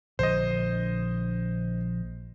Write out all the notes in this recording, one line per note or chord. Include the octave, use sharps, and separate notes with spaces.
A#1 D3 C5 D#5